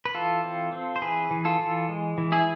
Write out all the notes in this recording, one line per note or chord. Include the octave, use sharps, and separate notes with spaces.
B4
E3 F4 A4
C4
C4
C5
E3 G#4 B4
E3
F4 A4
E3
G#3
E3
E4 G#4